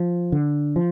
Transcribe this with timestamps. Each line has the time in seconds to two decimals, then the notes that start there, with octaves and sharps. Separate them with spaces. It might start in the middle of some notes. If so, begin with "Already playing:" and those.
Already playing: F3
0.32 D3
0.76 F3